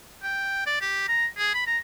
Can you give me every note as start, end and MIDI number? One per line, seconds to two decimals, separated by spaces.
0.23 0.63 79
0.66 0.79 74
0.81 1.03 67
1.08 1.26 82
1.37 1.53 68
1.54 1.64 83
1.67 1.78 82